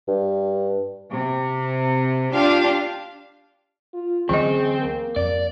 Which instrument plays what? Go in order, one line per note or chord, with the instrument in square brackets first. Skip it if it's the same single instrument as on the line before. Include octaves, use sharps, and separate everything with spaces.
[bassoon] G2
[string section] C3
D4 F4 G4 F5
[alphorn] F4
[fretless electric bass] D2 F#3 C#4 [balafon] E3 D#5 [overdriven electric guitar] C4 [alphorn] G#4
[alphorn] A#3
[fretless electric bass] F2 [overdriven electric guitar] D5